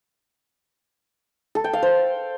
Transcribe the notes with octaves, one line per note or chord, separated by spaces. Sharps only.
A4
G5
F5
C5